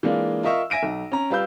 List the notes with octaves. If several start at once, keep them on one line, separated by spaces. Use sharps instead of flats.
E3 G#3 A#3 D4 F4
F4 A#4 D#5 E5 C#6 E6
E5 G#5 A#6 D7 D#7
B1
C#4 A#5
G3 F4 B4 E6 G6